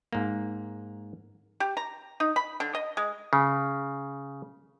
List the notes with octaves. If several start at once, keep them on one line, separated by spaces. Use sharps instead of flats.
G#2 A#3
G4
A#5
D#4
B5
D3
D#5
G#3
C#3